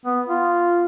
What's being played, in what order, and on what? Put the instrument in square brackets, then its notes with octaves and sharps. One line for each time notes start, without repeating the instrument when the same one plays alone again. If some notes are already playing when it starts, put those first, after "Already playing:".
[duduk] B3
F4